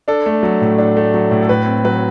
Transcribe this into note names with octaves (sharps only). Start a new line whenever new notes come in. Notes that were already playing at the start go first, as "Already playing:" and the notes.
D4 A4
A3
F#3
A2
D4
A3
F#3
A2
A4
A2 B4
C4
F#3 B4